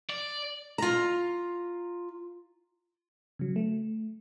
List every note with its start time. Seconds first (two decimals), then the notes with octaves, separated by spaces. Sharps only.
0.10 D5
0.78 F4 A#5
3.39 C#3 F#3
3.56 A3